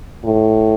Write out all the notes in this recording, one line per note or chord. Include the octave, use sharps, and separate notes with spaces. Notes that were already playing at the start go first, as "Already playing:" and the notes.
A2